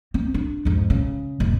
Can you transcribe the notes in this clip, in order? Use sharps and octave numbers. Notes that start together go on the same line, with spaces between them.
C4
D4
F2 G#2
C#3
F1 A2